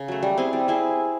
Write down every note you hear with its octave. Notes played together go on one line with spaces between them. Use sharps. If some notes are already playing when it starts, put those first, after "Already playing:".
Already playing: C#3
F#3 A3
G3
C4 E4 G#4
G3
C4 E4 G#4